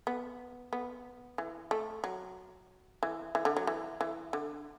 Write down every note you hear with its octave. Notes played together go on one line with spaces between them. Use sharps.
B3
B3
E3
A3
F#3
E3
E3
D3
F#3
E3
E3
D3